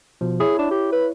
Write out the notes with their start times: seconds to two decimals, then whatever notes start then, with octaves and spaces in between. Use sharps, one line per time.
0.21 B2 F3
0.40 E4 G#4 C#5
0.59 D4
0.71 G4
0.92 B4